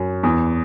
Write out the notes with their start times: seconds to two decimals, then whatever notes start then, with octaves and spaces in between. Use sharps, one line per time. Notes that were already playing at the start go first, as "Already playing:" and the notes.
Already playing: F#2
0.23 E2